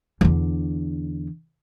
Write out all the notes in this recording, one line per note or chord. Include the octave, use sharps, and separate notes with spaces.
E2 D3